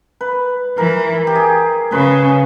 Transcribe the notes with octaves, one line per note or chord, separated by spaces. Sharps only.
B4
E3 A#4
G4
G#4
C#3 B4